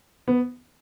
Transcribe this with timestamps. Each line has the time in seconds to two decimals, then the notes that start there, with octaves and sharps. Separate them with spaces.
0.28 B3